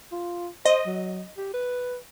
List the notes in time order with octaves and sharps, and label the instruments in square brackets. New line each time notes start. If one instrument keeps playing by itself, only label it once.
[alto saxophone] F4
[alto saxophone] C5 [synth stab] D#5
[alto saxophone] F#3
G4
B4